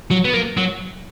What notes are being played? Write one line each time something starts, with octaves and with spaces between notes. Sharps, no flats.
F#3
B3
A#3
F#3